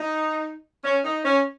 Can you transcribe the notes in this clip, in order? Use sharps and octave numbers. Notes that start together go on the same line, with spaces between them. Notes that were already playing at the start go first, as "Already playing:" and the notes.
Already playing: D#4
C#4
D#4
C#4